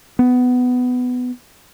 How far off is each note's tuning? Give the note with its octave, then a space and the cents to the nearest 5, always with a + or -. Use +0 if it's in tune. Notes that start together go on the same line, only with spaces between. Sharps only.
B3 +15